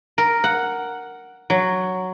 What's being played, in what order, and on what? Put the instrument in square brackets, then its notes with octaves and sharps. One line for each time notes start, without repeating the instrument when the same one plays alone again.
[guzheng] A#4
F#5
F#3